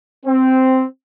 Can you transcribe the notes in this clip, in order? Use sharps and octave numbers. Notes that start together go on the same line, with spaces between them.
C4